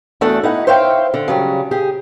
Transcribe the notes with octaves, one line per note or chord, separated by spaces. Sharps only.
E2 A3 D4 F#4 A4 F#5
D#4 E4 F#5
C5 C#5 E5 F5 G5
D3
C#3 F#3 G3
G4 G#4